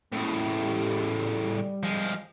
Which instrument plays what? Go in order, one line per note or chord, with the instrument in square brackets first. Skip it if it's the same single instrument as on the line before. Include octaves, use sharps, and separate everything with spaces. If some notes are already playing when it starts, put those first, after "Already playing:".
[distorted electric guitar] A2 C#3 [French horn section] G#3 A#3
[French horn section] G#3 G4
G3
G3
[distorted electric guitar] F3 G#3